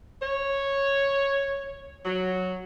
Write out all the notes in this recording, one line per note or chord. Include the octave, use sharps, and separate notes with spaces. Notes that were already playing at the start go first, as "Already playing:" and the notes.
C#5
F#3